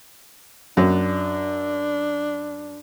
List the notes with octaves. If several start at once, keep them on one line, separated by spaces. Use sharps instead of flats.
F#2 D4